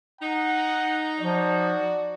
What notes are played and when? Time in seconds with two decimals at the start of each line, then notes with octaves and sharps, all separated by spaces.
0.21 D#4 F#5 A#5
1.19 F3 F#4 D5